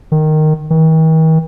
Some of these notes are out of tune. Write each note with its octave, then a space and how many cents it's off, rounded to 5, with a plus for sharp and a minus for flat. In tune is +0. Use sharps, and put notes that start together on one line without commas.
D#3 -10
D#3 +45